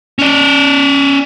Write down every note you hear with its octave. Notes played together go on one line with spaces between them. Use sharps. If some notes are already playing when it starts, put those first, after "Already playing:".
C#4 D5